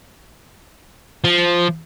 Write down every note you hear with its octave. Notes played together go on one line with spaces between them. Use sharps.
F3